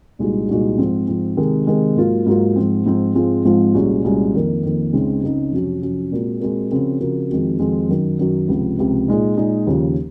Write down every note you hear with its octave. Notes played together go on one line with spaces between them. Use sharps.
C2 A#2 G#3 D#4 F#4
C2 A#2 G#3 D#4 F#4
G#2 F3 C4
G#2 F3 C4
C3 D#3 G#3
C3 D#3 G#3
G#2 F#3 A#3 F4
G#2 F#3 A#3 F4
G#2 F3 C4
G#2 F3 C4
G#2 F3 G#3 C4 F4
G#2 F3 G#3 C4 F4
C2 A#2 G#3 C#4 F#4
C2 A#2 G#3 C#4 F#4
F2 D#3 A#3
F2 D#3 A#3
C#2 C#3 G#3 C4 D#4
C#2 C#3 G#3 C4 D#4
F2 C3 F#3 C#4
F2 C3 F#3 C#4
A#2 G#3 C4 F#4 A#4
A#2 G#3 C4 F#4 A#4
C#3 F3 C4 F#4 A#4
C#3 F3 C4 F#4 A#4
F2 D#3 G#3 C4 F#4
F2 D#3 G#3 C4 F#4
F#2 D#3 F#3
F#2 D#3 F#3
C#2 C3 F3
C#2 C3 F3
A#2 G#3 D#4
A#2 G#3 D#4
D#2 C#3 F3